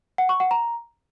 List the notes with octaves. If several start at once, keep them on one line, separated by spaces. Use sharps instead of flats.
F#5
C#6
F#5
A#5